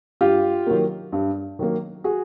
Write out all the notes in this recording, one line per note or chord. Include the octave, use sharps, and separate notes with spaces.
G2 F4 G4
D#3 F#3 A#3
G2
D#3 F#3 A#3
F#4 G#4